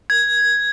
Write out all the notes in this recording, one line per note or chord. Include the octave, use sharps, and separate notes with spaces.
G#6